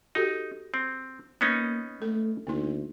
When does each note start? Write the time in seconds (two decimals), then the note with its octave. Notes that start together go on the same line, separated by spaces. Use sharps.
0.15 D#4 F#4 G4 A4
0.74 C4
1.41 A#3 B3 C#4 D#4
2.02 A3 A4
2.47 D2 A#3 D#4